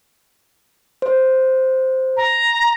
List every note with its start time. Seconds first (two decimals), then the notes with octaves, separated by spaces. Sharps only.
1.02 C5
2.17 A#5